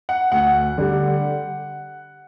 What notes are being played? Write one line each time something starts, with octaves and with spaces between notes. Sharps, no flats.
F#5
D2 F#5
D3 G3